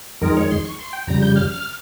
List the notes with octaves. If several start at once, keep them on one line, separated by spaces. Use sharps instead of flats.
F2 D#3 G#3 A#4
C#5
C6
C#6
C6
G5
F2 C#3 G3 A#5
G6
F6
F6